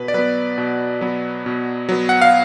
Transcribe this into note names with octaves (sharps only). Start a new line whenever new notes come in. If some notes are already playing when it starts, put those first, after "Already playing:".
Already playing: B2 B4
D5
F#3 B3 B4
B2
F#3 B3
B2
F#3 B3
F#5
F5